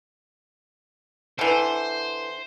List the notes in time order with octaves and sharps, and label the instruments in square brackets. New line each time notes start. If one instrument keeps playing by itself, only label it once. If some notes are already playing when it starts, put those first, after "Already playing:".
[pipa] D3 E3 [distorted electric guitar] C5